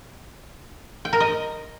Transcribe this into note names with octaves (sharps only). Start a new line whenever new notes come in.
G5
A#4
D#5